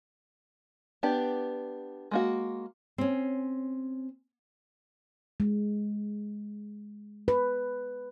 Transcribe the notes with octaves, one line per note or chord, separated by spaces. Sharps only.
B3 D4 G4
G#3 A#3 F#4
C4 C#4
G#3
B4